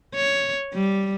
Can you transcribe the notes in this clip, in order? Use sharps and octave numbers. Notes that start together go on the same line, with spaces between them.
C#5
G3